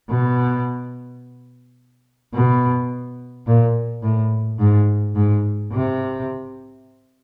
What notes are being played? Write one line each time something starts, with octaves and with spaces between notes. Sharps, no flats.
B2
B2
A#2
A2
G#2
G#2
C3